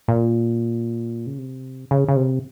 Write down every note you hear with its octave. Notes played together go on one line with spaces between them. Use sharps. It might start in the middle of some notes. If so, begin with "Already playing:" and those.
A#2
C#3
C3
C#3
C#3
C3